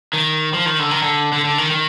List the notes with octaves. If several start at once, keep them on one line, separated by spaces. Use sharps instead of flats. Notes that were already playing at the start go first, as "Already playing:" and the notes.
D#3
F3
D#3
D3
D#3
D3
D3
D3
D#3
D#3